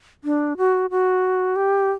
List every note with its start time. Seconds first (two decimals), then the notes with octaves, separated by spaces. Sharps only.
0.24 D4
0.57 F#4
0.90 F#4
1.56 G4